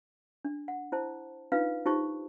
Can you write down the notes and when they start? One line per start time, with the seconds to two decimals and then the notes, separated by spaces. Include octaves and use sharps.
0.45 D4
0.68 F#5
0.92 E4 C5 A5
1.52 D4 D#4 F4 B4 F5
1.85 D#4 F4 G4 C5 A5 C#6